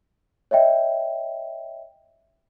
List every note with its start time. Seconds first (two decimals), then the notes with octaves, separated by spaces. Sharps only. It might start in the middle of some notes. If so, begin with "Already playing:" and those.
0.51 C#5 D#5 E5 G5